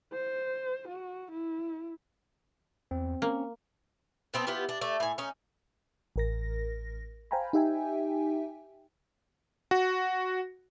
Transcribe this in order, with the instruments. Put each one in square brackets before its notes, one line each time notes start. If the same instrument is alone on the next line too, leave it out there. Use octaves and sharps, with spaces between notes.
[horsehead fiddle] C5
F#4
E4
[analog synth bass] E2 [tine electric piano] C4
[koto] A#3 [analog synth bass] C#4
[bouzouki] B3 C4 D#4 A4
B3 E4 F4 G4
D4
A3 D5
A2 G#5
C#4 D#4
[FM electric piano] A1 A#4 A#6
C5 F5 G5 G#5 A#5 B5
D#4 G4 E5 G5 G#5
[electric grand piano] F#4